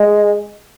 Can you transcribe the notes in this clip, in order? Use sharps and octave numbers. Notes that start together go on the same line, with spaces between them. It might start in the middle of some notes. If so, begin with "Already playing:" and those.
Already playing: G#3